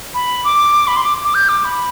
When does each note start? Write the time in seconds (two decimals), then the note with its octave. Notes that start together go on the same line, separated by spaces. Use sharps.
0.14 B5
0.45 D6
0.88 B5
0.96 C6
1.04 D6
1.24 D6
1.35 G6
1.49 D6
1.65 B5